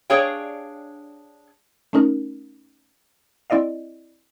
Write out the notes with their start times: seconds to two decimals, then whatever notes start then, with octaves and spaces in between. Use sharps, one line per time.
0.10 D4 G#4 C#5 F5 G5
1.93 A3 C#4 D#4 A#4
3.50 C4 E4 D5 D#5 F5